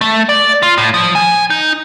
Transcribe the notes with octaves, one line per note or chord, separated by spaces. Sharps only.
A3
D5
F4
A2
F3
G#5
D#4